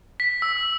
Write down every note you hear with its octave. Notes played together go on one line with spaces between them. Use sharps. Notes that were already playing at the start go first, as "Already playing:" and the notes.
B6
E6